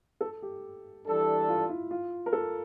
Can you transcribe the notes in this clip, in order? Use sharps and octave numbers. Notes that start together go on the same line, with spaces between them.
A4
G4
E3 G3 D4 A4
F4
E4
F4
A#4
A4